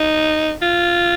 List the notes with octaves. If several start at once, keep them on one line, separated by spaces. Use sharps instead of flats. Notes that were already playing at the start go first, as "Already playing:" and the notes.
Already playing: D#4
F4